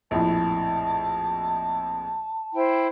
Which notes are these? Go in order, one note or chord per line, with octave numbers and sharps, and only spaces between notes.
A#1 F2 A2 A5
E4 C5 G5